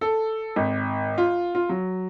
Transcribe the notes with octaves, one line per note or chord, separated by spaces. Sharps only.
A4
G#1
F4
F4
F#3